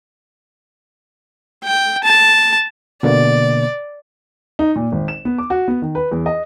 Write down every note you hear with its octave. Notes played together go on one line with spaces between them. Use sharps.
G5
A5
B2 D3 A#3 D5
D#4
A#2
G#1
E7
B3
D6
F#4
B3
D#3
B4
E2
D#5